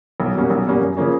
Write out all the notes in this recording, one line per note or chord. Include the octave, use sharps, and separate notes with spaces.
B1
B2 G3 A#3 C#4
B1
B2 G3 A#3 C#4
F#2
C#3 F3 A#3 C#4